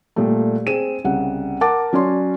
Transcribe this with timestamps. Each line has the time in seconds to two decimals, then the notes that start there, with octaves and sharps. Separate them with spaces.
0.16 A#2 G3 A3
0.66 C4 G#4 D#7 E7
1.04 C2 C#3 F#5
1.61 A#4 F#5 A5 D6 A6
1.93 F#3 C#4 D5 C6